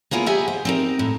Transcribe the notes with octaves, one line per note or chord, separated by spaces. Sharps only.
A#3 B3 E4 F4 G#4
G4 G#4 D#5 E5 F#5 G#5
C5
C4 D#4 A#4
A2